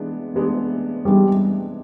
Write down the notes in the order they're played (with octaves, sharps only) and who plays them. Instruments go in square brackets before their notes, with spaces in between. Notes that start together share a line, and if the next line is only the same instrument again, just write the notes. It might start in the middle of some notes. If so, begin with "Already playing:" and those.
Already playing: [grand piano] C3 E3 G#3 B3 D4
C3 E3 G#3 B3 D4
[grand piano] C3 E3 G#3 B3 D4 [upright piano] G3